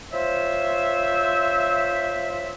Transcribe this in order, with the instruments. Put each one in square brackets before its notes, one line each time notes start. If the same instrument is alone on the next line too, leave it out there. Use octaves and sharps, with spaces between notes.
[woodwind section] F4 C5 C#5 E5